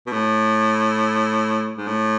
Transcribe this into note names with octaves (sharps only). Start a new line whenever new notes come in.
B2
A2
G#2
A2